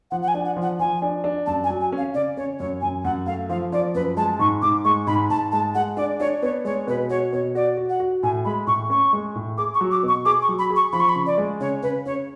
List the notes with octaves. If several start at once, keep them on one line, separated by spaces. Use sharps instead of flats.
F3 F#5
F#5
G#5
D4
F#5
F3
F#5
F3 G#5
D4
D4
F#2 A5
G#5
F#3
G#5
C#4
F5
C#3 D5
C#4 C#5
F#2 C#5
F#2 G#5
F#2 F#5
A3 F5
F3 F5
F3 D5
F#2 B4
G#3 A5
G#2 C#6
G#2 D6
G#3 C#6
G#2 B5
G#2 A5
G#3 A5
G#3 F#5
D4 D5
D4 C#5
B3 C#5
G#3 C#5
B2 B4
F#4 C#5
B2 C#5
F#4 D5
F#4
F#5
F#4
A2 G#5
G#3 B5
A2 C#6
C#4 C#6
G#3
A2
G#4 D6
C#6
F#3
D6
B2
C#6
G#4 D6
C#6
F#3
B5
G#4
C#6
F3 B5
C#6
B5
C#3
D5
G#3
C#3 C#5
C#3 B4
C#3 C#5